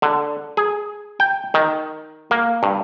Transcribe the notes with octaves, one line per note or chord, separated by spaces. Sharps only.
D3
G#4
G5
D#3
A#3
G2